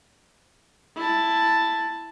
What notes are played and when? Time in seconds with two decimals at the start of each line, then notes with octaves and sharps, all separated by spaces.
0.96 E4 A5